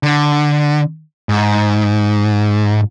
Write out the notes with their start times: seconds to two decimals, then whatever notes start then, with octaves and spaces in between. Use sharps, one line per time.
0.03 D3
1.29 G#2